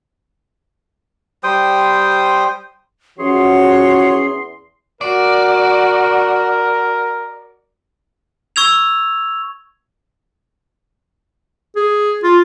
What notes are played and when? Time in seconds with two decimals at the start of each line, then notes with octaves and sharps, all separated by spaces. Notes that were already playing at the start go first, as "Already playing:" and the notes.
1.44 G3 C5 G5 D#6
3.19 E2 E3 F3 C#4 F#4 G#4 C#5 C6
5.01 F#4 A#4 D5
8.56 C#6 E6 G#6 F7
11.76 G#4
12.23 F4